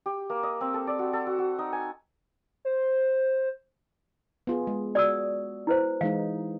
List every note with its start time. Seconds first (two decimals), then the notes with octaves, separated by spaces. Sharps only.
0.06 G4
0.30 A#3
0.43 D#5
0.61 C4
0.74 A4
0.87 D5
0.99 F#4
1.13 A4
1.27 F#4
1.38 F#4
1.59 D#4
1.73 G#5
2.65 C5
4.47 B3 F4 G#4
4.67 G#3
4.95 F#4 D5 D#6 E6
5.67 E4 B4 C5
6.01 E3 G#3 D#4 F5